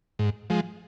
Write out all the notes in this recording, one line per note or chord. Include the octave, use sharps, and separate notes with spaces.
G#2
F3 G#3